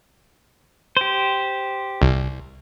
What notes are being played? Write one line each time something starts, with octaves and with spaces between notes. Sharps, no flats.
G4 C5
C2